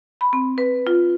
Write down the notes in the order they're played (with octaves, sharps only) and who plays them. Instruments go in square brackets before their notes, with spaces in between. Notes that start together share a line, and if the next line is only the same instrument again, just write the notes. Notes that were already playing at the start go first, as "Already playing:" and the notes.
[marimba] B5
C4
B4
F4